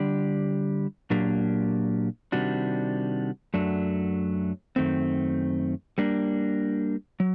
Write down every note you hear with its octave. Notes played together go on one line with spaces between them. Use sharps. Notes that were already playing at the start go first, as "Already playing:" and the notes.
Already playing: D3 G3 D4 G4 D5
A#2 F#3 A#3 D4 G4
C3 D#3 G3 D4 F#4
F#2 F#3 A3 D4
F#2 D#3 A3 C4
G3 A#3 D4
F#3